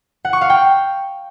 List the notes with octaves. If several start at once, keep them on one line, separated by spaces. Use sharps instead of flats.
F#5
C#6
F5
G5